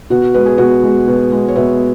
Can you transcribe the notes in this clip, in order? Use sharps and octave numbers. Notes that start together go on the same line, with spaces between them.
B2 F#4
G#3 B4
G#4
B2 F#4 B4
G#3
B2
G#3
C#5
B2 B4 E5